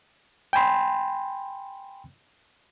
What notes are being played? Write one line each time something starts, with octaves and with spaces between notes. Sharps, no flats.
G5 G#5 B5 C6